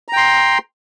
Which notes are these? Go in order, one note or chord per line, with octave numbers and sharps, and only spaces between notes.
G5 A#5 C6